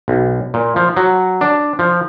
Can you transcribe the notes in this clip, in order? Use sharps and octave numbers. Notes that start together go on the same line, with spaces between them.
B1
A#2
F3
F#3
D4
F3